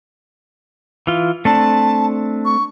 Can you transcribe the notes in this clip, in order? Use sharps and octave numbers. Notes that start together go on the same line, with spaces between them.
E3 F4
A3 C4 D4 A5
C#6